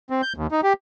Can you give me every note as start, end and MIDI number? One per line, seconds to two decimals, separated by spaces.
0.10 0.22 60
0.22 0.33 91
0.37 0.47 39
0.51 0.61 63
0.63 0.73 67